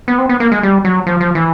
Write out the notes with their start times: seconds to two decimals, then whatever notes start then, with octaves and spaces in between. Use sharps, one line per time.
0.08 B3
0.18 C4
0.29 B3
0.40 A#3
0.52 G#3
0.63 G3
0.85 F#3
1.07 F3
1.20 F3
1.35 E3